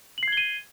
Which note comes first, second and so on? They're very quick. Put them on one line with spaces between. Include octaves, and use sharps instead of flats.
F#7 C7 G#6 G7 D#7